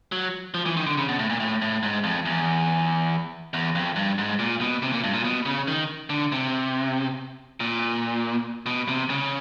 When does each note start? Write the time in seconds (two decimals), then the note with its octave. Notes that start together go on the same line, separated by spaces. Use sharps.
0.12 F#3
0.54 F3
0.66 E3
0.77 D#3
0.87 D3
0.98 C#3
1.09 B2
1.19 A2
1.30 A#2
1.40 A2
1.62 A2
1.83 G#2
2.04 F2
2.26 E2
3.54 E2
3.75 F2
3.96 G2
4.18 G#2
4.39 A#2
4.61 B2
4.82 C3
4.93 A#2
5.04 G2
5.14 A#2
5.24 B2
5.46 C#3
5.68 D#3
6.10 D3
6.32 C3
7.60 A#2
8.66 B2
8.88 C3
9.10 C#3